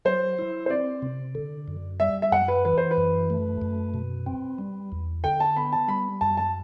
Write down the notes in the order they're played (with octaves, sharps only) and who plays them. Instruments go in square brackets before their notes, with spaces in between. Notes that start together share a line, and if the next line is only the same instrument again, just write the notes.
[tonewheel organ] F#3 [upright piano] C5
[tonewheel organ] E4
[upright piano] C5
[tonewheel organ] C4 [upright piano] D5
[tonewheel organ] C3
D3
F#2
[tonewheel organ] G3 [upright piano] E5
[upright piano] E5
[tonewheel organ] F#2 [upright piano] F#5
[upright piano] B4
[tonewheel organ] E3 [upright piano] B4
[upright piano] C5
B4
[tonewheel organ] F#2
A3
F#2
B2
C4
G3
E2
[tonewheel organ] D3 [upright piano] G5
[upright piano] A5
[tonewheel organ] B3 [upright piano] B5
[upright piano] A5
[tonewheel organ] G3 [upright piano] B5
[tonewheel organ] F#2 [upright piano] A5
[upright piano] A5